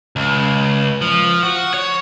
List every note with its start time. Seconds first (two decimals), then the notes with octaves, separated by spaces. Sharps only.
0.16 C#2
1.02 F3
1.43 F#4
1.74 C#5